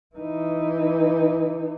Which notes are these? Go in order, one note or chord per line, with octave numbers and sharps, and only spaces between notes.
E3 D#4